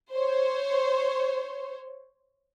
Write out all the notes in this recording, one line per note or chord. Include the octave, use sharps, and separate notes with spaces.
C5 C#5